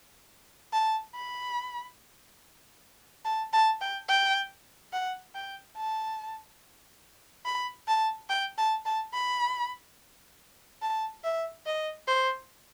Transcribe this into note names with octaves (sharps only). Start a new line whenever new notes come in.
A5
B5
A5
A5
G5
G5
F#5
G5
A5
B5
A5
G5
A5
A5
B5
A5
E5
D#5
C5